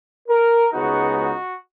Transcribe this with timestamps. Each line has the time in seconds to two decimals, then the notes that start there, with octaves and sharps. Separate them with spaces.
0.28 A#4
0.72 C#2 C#3 G#3 B3 D#4 F#4
1.15 F#4